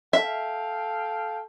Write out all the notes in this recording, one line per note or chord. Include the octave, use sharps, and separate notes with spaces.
A4 E5 F5 G5